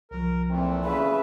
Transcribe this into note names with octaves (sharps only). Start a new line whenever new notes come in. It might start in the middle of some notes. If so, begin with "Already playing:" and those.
C2 F3 A#4
A#2 E3 A3 C4
C#3 B4 E5